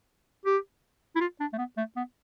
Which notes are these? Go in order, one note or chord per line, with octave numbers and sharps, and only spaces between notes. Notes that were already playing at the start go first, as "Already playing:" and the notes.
G4
E4
F4
D4
A3
B3
A3
B3